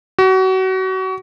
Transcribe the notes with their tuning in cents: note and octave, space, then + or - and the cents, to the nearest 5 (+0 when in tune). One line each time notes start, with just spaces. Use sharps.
F#4 +30